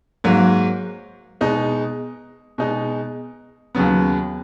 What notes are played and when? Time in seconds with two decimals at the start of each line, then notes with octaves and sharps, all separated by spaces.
0.24 G#2 F#3 A#3
1.41 B2 G#3 D#4
2.58 B2 G#3 D#4
3.75 D#2 C#3 F#3 B3